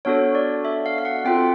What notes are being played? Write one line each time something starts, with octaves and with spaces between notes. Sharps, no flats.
B3 D4 F#4 A4 C#5
D5
E5
F5
F5
F#5
C4 F4 A4 G5